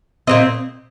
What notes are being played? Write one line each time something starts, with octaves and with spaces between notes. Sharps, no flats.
A#2 G#3 C4 D#5